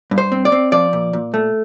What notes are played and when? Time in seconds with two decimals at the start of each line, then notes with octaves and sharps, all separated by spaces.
0.11 G2
0.18 C5
0.32 C4
0.45 D5
0.52 C4
0.72 F3 D5
0.93 A#2
1.13 A#2
1.34 A3